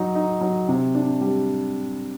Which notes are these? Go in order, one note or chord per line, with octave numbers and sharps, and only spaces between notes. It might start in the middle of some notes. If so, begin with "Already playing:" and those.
Already playing: F#3 D#4
D#4
F#3
C3
D4
G3